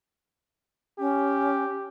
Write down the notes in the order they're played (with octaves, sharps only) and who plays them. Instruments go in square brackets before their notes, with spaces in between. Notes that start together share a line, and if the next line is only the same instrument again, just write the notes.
[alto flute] C#4 [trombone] G4